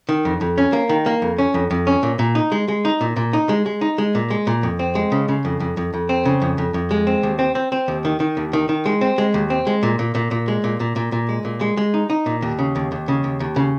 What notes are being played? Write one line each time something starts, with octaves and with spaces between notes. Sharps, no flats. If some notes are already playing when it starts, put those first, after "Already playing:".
D#3
F2
F2
C#4
A#3
D#3
A#3
F2
C#4
F2
F2
C#4
A#2
A#2
D#4
G#3
G#3
D#4
A#2
A#2
D#4
G#3
G#3
D#4
G#3
A#2
G#3
A#2
F2
C4
G#3
C#3
C#3
F2
F2
F2
F2
C4
C#3
F2
F2
F2
G#3
C4
D#2
C4
C4
C4
D#2
D#3
D#3
D#2
D#3
D#3
G#3
C4
G#3
D#2
C4
G#3
A#2
A#2
A#2
A#2
G#3
A#2
A#2
A#2
A#2
G#3
A#2
G#3
G#3
D#4
D#4
A#2
D#2
C#3
D#2
D#2
C#3
D#2
D#2
C#3